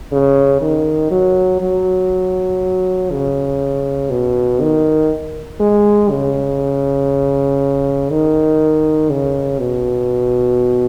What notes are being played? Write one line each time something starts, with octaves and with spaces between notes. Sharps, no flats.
C#3
D#3
F#3
F#3
C#3
B2
D#3
G#3
C#3
D#3
C#3
B2